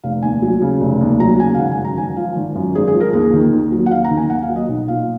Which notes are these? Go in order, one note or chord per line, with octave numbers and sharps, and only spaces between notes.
F1 F5
D#2 G#5
F#3
C#3
F1
D#2
F#3 A#5
C#3 G#5
F5
G#1 F#5
G#5
F#2
A#5
G#1 G#5
F3 F5
G#1
F#2
G#1 G#4
G#4
F3
A#4
D#2 G#4
D#3
D#2
F#3
F#5
D#2 F5
A#5
D#3
G#5
D#2 F#5
F5
F#3
D#5
B1
A#2 F5